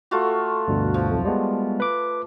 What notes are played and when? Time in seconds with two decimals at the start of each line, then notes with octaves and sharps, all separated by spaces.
0.11 A3 F4 F#4
0.68 D2 G2 B2
0.94 F3
1.11 B1 F2
1.25 G3 G#3 B3
1.80 B4 D6